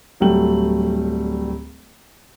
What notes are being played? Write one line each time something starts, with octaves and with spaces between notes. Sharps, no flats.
D1 F#3 G3 A3 G5 F#7